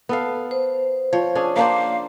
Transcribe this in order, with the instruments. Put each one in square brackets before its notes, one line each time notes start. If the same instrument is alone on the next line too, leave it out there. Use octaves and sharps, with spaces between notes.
[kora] B3 A4 F5
[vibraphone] C5
[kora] F3 C#5
C#4 D4 G#4
[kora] A#3 D4 C5 [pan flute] F5